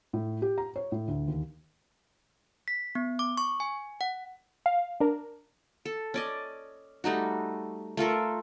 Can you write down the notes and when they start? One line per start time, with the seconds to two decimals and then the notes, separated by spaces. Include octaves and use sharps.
0.13 A2
0.42 G4
0.58 A#5
0.76 C#5
0.92 A2
1.08 D2
1.28 D#2
2.68 B6
2.95 B3
3.19 D6
3.37 C#6
3.60 G#5
4.01 F#5
4.66 F5
5.00 D4 A#4
5.85 A4
6.14 C#4 D5 D#5
7.04 G3 A3 D#4 F#4
7.97 A3 F4 A4 A#4